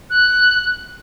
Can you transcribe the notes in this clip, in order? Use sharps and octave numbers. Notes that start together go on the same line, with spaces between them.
F#6